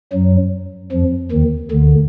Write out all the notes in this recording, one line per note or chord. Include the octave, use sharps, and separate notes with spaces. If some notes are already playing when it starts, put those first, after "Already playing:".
F#2 F#3
F2 F3
D#2 D#3
D2 D3